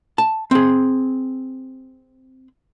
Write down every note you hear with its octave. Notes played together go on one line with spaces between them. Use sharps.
A5
C4 G#4